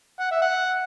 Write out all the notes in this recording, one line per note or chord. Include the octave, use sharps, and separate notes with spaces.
F#5
E5
F#5